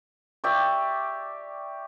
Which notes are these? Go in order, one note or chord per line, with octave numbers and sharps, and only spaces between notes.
G4 D5 E5 C#6